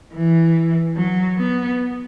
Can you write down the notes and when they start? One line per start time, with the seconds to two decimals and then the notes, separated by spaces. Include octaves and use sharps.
0.14 E3
0.96 F#3
1.38 B3